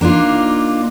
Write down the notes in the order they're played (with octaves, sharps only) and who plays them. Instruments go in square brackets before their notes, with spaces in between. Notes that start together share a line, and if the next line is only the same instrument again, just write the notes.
[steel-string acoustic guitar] A#3 D4 D#4 F4